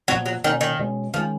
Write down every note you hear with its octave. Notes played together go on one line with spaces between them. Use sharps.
A#2 F3 F#3 B3
F#3
B2 D#3 A#3 C#4
D#3
B2 G#3 C#4
D#3 F3 G#3 C#4